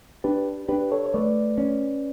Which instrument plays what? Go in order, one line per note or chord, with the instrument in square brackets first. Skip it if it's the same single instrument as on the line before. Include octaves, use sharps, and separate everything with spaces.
[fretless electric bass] D4 [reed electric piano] G4 B4
[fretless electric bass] D4 [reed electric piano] G4 B4
[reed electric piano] A4 C#5
C#5
[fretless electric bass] A3 [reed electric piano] B4 D5
[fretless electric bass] C#4